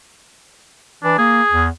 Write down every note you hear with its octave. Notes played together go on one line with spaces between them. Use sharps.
E3 D4
A#3 G#4
E2